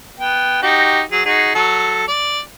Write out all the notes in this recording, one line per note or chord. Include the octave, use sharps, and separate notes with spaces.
B3 G5
D#4 F#4 G4
F#3 G#4
D#4 F#4 G#4
F#3 A4
D5